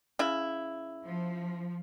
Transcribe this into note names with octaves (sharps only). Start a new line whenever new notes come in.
C#3 E4
F3